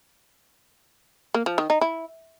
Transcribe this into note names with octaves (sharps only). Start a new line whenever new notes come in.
A#3
F3
D#3
D#4
E4